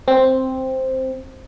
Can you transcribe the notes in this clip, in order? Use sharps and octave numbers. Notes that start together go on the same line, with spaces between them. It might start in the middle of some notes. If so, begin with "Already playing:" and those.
C4